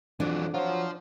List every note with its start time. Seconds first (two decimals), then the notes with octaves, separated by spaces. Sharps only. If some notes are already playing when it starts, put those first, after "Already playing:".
0.20 F2 E3 F#3 D4
0.54 F3 F#3 F4 C5